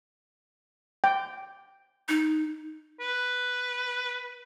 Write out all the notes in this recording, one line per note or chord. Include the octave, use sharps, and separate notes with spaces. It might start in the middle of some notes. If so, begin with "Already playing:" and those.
G5
D#4
B4